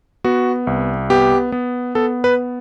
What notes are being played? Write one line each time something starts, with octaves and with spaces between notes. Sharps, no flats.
B3 F#4
C2
B3 G4
B3
B3 A4
B4